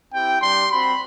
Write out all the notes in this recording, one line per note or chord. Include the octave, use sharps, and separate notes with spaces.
C4 E4 G4 G5
G3 D4 G4 C6
C4 F#4 B5